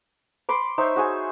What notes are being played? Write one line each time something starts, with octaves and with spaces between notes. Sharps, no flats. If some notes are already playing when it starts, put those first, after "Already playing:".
B5 C6 D6
D#4 C5 C#5 E5
F#4 G#4 G#5